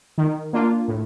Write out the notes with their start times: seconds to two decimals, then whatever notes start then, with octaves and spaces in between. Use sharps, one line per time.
0.18 D#3
0.53 A#3 D4 F4
0.88 A2